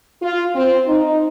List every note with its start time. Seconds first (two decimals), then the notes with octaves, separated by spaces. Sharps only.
0.22 F4
0.55 C4
0.88 D#4